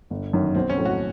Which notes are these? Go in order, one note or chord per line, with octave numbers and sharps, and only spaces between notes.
G1
F#2 D#3
B1 C4
C#4
A2 F#3
F#4